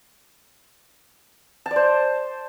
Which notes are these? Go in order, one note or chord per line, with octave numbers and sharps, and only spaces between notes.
A5
D5
C5